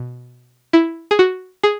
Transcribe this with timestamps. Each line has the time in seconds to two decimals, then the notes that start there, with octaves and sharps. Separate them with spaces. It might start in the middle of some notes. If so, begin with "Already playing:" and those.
Already playing: B2
0.73 E4
1.11 G#4
1.19 F#4
1.63 G#4